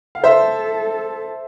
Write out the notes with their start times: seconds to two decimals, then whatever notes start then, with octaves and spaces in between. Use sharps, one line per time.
0.15 F5
0.24 A4 C5 E5